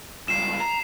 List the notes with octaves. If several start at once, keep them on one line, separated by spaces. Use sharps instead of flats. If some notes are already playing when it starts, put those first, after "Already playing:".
C#2 G2 C7 E7
A#5